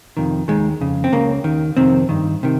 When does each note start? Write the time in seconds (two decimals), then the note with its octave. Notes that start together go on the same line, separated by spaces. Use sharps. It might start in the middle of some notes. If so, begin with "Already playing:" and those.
0.17 F2 C3 D#3
0.48 D#2 D#3 G#3
0.81 F2 C#3
1.04 C4
1.13 C#2 C#3 A#3
1.44 D#2 D#3
1.77 F2 C3 D#3 C4
2.09 G2 D#3
2.43 C3 D#3